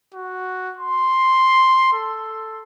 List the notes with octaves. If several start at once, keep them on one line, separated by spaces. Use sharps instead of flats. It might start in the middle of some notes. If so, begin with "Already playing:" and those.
F#4
C6
A4